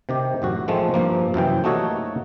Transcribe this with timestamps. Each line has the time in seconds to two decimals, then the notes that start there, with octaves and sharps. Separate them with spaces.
0.09 C3 D#3 G4
0.42 A1 F#2 F#4
0.68 D#3 F3 G#3 A3 C4
0.94 G2 F3 A#3
1.34 F#2 C3 E3 G5
1.64 A3 A#3 D#4 F#4 A4 C#5